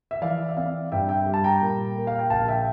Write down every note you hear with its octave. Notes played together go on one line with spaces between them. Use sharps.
E5
E3 D5 F5
E5
C4 D5 F5
G2 E5 G5
E5 G5
G3
A5
G5 A#5
A#2
A#3
F5
G5
A#1 F5 A5
E5 G5